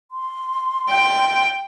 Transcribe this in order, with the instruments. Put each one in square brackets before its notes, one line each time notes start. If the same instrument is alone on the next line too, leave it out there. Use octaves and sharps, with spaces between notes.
[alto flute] C6
[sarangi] G5